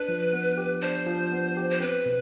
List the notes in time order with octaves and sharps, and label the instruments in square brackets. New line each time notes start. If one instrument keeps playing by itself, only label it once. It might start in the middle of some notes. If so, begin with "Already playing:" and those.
Already playing: [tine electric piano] D4 [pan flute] B4
[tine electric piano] F3
B3
G4
[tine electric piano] D4 [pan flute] C5
[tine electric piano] F3
B3
G4
[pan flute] C5
[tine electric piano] C4 [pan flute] B4
[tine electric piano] B2